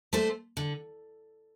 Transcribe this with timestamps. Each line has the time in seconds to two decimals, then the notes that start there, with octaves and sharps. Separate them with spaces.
0.13 A3 D4 A4 C5
0.57 D3